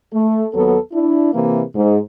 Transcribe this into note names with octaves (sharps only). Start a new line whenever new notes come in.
A3
D#2 F#3 B3 A4
D4 E4
C3 E3 A#3
G#2